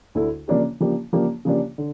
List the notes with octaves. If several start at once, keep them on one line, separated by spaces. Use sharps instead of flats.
D2 D3 A3 E4
C#3 F3 A#3 D4 G4
C#3 F3 A#3 D4 G4
C#3 F3 A#3 D4 G4
C#3 F3 A#3 D4 G4
D3